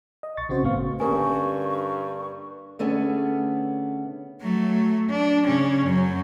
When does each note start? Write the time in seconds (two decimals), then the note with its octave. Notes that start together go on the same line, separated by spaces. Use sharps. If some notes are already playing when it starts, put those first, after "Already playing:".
0.23 D#5
0.37 B1 C#6 A6
0.49 C#3 C4 C#4 F#4 C5
0.63 G#1 A2 A3 B3 F5 C#6
1.00 G2 D3 A#3 C#4 G4 A#4 G#5 C#6
2.79 D3 A3 B3 C#4 G#4
4.41 F#3 A3
5.10 D4
5.46 C#3 C#4
5.86 F#2 F#3